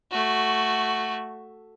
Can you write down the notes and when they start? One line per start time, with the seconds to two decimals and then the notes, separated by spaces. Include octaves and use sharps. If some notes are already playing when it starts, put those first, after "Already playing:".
0.12 A3 F#4